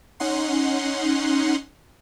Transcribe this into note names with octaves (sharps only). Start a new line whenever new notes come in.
C#4 D#4 F#5 C6